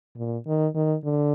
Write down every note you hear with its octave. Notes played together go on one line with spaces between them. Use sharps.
A#2
D#3
D#3
D3